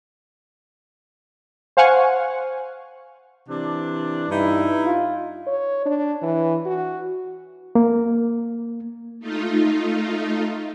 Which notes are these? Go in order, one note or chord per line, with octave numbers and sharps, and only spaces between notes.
C5 F5 F#5 G#5 C#6
C3 E3 D4
G2 D#4 E4
F4
C#5
D4
E3
F#4
A#3
A3 D#4 F4